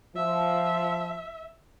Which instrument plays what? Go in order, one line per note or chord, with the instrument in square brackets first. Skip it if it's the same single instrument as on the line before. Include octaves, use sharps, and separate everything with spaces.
[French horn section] F3 [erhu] E5